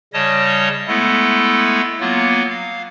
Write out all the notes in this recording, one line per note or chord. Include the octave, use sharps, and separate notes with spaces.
C#3 G3 C#5 D#5 A5 D#6
G#3 A3 B3 E4 A4
F#3 A#3 B3 F4
F5